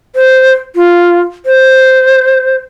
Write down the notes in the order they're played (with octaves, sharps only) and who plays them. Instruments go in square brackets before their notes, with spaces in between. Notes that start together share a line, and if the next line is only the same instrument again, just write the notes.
[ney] C5
F4
C5